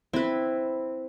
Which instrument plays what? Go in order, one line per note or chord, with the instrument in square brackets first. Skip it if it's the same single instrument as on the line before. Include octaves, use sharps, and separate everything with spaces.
[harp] C4 [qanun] E4 B4